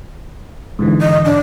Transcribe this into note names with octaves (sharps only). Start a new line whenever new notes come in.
G#2 D3 E3
D#5
D4